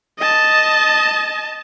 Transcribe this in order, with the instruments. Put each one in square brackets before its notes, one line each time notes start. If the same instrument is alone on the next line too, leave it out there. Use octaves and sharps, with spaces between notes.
[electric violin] D#5 A5